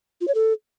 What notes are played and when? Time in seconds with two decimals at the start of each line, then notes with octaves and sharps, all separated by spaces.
0.21 F4
0.28 C#5
0.35 A4